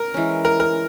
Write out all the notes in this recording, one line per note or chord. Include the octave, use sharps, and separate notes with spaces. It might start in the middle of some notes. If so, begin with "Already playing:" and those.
Already playing: A#4
E3 G#3 C#4
A#4
A#4